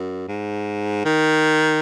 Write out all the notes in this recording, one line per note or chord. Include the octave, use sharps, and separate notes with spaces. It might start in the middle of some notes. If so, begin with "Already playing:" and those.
Already playing: F#2
G#2
D#3